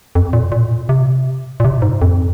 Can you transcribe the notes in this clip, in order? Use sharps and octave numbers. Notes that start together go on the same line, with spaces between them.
F2
A#2
A#2
C3
A#2
C3
G#2
F2